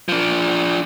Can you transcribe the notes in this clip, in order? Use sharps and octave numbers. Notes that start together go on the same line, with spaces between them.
F3 D4